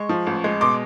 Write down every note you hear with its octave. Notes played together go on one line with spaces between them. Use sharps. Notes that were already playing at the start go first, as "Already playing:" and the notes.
Already playing: G#3 C#6
F3
A1
G#3
B2 C6 D6